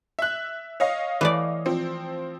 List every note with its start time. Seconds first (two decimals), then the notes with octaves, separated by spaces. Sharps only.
0.19 E5 F#6
0.80 C#5 D#5 F5
1.21 E3 A3 D5
1.66 F3 C4